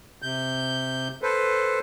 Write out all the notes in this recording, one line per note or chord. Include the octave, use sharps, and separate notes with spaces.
C3 G6
A4 B4 C5